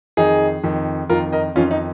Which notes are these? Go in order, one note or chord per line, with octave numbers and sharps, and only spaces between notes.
F2 D#3 D#4 G#4
F2 D#3
F2 D#3 F4 A#4
A#4 D#5
F2 D#3 C#4 F4
D#4